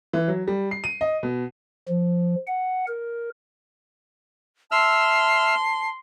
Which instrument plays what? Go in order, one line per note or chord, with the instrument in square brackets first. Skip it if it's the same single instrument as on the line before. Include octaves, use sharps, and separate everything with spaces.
[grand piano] E3
F#3
G3
C7
D#7
D#5
B2
[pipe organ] F3
F#5
A#4
[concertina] E5 E6 F6 [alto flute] A5 [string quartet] C6